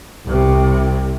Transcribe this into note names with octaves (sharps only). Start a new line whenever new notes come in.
C2 C3